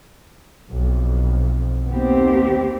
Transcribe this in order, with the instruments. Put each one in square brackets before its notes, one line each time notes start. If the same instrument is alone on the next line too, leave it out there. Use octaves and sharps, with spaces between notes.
[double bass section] B1 F2
[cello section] D#2 C4 G4 [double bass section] B3